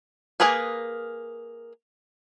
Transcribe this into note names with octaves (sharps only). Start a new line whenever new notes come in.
A#3 G#4 A#4 B4 G#5